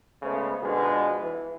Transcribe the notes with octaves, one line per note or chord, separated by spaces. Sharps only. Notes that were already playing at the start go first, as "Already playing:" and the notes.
C#3 G#3 A3 B3 C5
B2 D3 F3 G#3 B3
E3